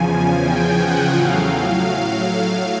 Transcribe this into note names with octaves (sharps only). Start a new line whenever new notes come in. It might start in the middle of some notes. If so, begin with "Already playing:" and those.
Already playing: E2 C#3 F3 G#5
G5
F#5
A2 F#3 F5